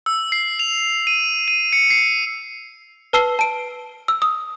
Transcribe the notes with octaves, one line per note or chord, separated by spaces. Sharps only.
E6
C7
F7
D#7
D#7
C#7
C7
B4 A5 E6 C7 G7
A5 D7
E6
D#6